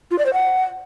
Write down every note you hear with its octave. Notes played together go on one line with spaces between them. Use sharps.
F4
D5
C5
F#5